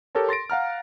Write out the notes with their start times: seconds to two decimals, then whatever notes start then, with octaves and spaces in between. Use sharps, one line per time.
0.15 G4 A4 A#4 C#5 A5
0.29 C6 A6 A#6 D7
0.50 F5 F#5 A#5 F6